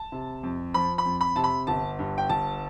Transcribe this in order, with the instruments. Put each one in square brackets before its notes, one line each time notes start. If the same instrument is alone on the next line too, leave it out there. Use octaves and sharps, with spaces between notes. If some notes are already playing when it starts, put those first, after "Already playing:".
Already playing: [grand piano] A5
C3
F2
F3 B5
B5
F2
B5
C3 A5
B5
G1 A5
G2
G5
G1 A5